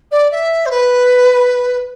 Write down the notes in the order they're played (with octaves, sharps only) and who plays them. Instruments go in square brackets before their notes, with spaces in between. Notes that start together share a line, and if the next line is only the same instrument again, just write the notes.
[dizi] D5
E5
C5
B4